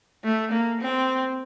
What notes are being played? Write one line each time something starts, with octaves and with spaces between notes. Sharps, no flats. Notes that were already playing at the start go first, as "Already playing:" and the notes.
A3
A#3
C4